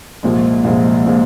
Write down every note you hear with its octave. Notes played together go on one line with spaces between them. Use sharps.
C2 A#2 F3 G#3
C2 A#2 F3 G#3
A#2 F3 G#3